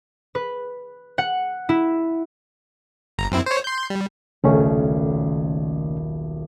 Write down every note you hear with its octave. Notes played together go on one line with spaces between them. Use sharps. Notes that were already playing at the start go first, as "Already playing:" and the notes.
B4
F#5
E4
G1 A#5
F#2 C4 E4
C5 C#5
C6 G6
G3
D#1 B1 C#3 A3 C#4 A#4